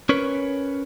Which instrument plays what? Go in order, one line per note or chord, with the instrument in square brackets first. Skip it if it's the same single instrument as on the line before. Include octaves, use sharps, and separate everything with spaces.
[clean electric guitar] C#4 A#4 B4 C#5